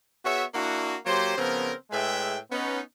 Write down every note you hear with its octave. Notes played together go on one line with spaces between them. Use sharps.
B3 F#4 G#4 C#5 E5
A#3 D4 E4 F#4
F#3 A#3 G4 C5
C#3 F3 B3 C4 A#4
A2 G#3 G#4 B4 E5 G5
B3 C#4 D#4